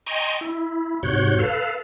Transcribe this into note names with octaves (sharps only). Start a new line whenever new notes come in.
D#5 G5 G#5 A#5 C6 C#6
E4
G#2 C3 F#4 C#5 F#6 G6
A4 B4 F5